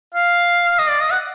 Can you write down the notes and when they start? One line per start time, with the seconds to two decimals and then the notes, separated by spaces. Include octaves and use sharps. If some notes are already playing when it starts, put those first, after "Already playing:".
0.15 F5
0.79 D#5
0.89 D5
1.01 D#5
1.11 F#5